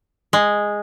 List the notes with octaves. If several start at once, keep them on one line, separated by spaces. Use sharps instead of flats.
G#3